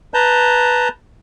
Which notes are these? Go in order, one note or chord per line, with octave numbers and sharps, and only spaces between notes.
B4 A5 A#5 G6